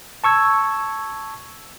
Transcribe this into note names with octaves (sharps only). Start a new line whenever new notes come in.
A5 C#6 E6 G#6